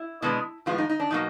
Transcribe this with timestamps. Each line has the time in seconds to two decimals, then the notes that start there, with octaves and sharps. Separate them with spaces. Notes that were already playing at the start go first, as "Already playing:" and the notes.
Already playing: E4
0.22 B2 G#3 B3 D4
0.66 A2 F3 G#3 B3 F4
0.78 D#4
0.90 D#4
1.00 D4
1.11 B2 F#3 A#3 D#4